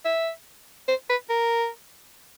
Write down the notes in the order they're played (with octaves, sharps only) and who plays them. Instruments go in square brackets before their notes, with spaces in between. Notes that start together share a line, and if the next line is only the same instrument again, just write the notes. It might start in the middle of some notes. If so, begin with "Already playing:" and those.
[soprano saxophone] E5
C5
B4
A#4